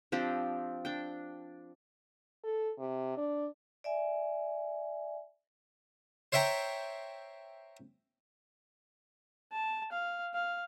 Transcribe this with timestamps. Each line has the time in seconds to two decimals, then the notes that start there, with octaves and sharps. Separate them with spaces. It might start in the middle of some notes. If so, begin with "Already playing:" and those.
0.12 F3 C4 D4 G4
0.85 D4 G5
2.43 A4
2.79 C3
3.17 D4
3.84 D5 E5 G#5
6.32 C5 C#5 E5 G5 A#5
9.52 A5
9.92 F5
10.34 F5